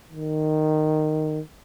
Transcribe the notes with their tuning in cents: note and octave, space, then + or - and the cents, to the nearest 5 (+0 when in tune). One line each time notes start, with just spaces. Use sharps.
D#3 -10